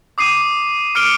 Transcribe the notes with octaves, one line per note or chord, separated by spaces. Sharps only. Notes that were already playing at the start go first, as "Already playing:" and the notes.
D6 D#6 C7 D#7
D6 F6 C#7 D7 G7